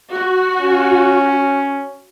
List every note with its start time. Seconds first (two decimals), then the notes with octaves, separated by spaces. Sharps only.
0.12 F#4
0.61 C#4